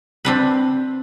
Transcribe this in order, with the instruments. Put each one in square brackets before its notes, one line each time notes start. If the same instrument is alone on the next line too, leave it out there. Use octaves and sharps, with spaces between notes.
[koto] C4 D4 B4